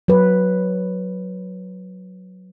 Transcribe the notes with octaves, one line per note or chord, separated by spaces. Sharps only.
F#3 B4